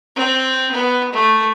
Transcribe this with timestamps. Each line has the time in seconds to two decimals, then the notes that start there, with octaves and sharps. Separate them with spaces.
0.16 C4
0.71 B3
1.12 A3